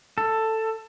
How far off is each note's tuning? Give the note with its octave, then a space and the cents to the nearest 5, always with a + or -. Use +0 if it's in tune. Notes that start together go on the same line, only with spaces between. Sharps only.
A4 +10